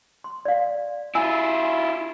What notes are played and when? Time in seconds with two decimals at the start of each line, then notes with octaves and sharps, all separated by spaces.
0.24 C6
0.45 D5 F5
1.15 E4 F4 G#5 E6